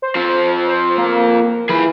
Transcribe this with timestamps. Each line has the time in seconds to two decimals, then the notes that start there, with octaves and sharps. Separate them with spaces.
0.02 C5
0.15 F3 C4
0.67 C5
0.98 A#3
1.69 E3 G#4 B5